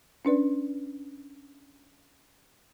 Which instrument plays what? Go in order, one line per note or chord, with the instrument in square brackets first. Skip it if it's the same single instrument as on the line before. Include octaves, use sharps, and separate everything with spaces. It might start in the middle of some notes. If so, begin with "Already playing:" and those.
[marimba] C#4 D4 B4 D5